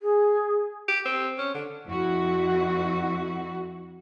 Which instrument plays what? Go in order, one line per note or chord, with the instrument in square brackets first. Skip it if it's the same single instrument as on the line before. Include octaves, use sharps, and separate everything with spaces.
[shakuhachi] G#4
[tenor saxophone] G4
C4
C#4
D3
[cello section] F2 E4 F#4